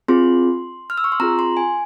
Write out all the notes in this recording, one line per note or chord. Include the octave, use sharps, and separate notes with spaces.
C4 F4 G#4 C6
F6
E6
C#6
C6
C4 F4 G#4 A#5
C6
G#5